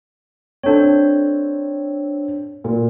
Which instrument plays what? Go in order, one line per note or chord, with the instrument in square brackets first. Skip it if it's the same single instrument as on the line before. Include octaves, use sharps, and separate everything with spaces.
[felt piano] C4 A4 [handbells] D4 C#5
[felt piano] A#2